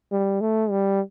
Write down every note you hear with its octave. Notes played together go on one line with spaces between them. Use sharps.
G3
A3
G3